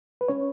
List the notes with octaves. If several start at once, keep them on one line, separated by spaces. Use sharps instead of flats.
B4
C#4 C#5